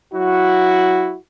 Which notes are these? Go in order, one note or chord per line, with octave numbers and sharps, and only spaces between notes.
F#3 E4 F#4